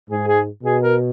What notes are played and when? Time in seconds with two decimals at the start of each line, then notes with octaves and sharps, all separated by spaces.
0.10 G#2 G#4
0.27 G#4
0.64 B2 G#4
0.83 A#4